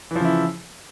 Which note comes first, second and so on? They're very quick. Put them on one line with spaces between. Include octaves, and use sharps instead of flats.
E3 F3 C#3 E4